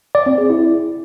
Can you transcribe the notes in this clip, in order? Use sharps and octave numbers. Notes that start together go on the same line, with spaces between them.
D5
C4
G#4
E4